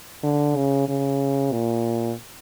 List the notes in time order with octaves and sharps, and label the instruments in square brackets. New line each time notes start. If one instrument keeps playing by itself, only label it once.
[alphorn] D3
C#3
C#3
A#2